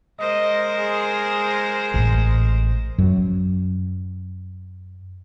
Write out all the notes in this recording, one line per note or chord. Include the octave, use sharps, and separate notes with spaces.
G#3 A#4 C5 D#5
G#4
A1
F#2 F#3